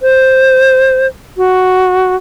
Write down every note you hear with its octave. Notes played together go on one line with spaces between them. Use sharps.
C5
F#4